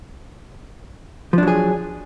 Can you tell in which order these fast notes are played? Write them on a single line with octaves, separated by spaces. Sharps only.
F3 D4 F#3 G#4